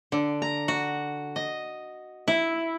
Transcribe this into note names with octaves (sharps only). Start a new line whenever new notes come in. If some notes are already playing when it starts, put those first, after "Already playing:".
D3
A#5
F#4
D#5
E4